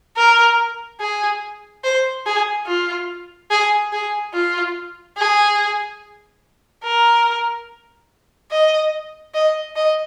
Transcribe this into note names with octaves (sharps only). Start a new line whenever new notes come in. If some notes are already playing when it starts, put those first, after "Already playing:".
A#4
G#4
C5
G#4
F4
G#4
G#4
F4
G#4
A#4
D#5
D#5
D#5